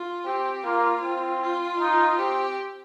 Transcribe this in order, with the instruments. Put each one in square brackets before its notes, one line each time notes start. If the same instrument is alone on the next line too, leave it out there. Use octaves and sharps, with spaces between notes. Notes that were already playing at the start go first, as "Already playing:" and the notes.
Already playing: [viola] F4
[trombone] C4 [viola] G4
[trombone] A#3 [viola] F4
[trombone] C4
[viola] F4
[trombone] D#4
[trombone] C4 [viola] G4